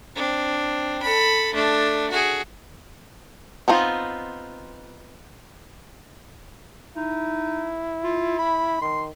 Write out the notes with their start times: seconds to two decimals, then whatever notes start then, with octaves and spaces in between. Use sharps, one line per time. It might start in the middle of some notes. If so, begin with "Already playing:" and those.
0.16 C4 D4
1.02 A4 B5
1.54 A3 D4
2.10 F#4 G#4
3.68 B3 C4 D#4 F4
6.96 D#4 E4
8.04 F4
8.39 B5
8.82 D#3 C6